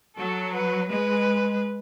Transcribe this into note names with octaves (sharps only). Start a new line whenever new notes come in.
F#3 A4
B4
G#3 B4